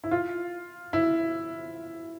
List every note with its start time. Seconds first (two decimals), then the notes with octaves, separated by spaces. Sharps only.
0.04 E4
0.11 F4
0.93 E4